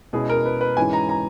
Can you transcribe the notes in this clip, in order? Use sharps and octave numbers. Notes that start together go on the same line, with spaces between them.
B2 G#3 C#4 E4 G#4
A#4
B4
B4
G#2 E3 G#3 C#4 E4 G#5
A#5
A#5